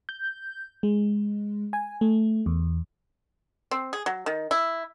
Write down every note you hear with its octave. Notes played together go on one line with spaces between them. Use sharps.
G6
G#3
G#5
A3
E2
C4
G#4
F#3
D#3
E4